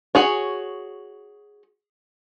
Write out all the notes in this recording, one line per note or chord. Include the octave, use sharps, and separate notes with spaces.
F#4 G#4 C#5